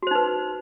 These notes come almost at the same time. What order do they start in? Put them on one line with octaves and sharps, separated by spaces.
F#4 C5 D#4 B4